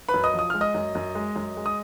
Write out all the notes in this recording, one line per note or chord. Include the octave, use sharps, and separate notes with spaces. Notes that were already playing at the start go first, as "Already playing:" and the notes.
B4 B5
F#2
D#5 D#6
F3
D#6
G#3 F6
D#5 D#6
F#2
F#2
G#3
F#2
G#3
D#6